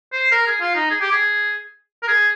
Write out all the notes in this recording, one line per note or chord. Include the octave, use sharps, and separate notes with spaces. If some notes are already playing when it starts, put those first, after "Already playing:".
C5
A#4
G#4
F4
D#4
G#4
G4
G#4
A#4
G#4